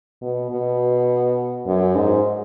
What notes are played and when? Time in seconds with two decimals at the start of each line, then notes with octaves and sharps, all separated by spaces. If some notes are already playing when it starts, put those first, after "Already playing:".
0.22 B2
0.50 B2
1.67 F#2
1.95 G#2